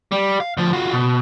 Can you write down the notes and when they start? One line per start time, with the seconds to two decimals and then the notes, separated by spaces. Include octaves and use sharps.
0.12 G3
0.40 F5
0.57 D2 F3
0.73 F4 F#4
0.93 B2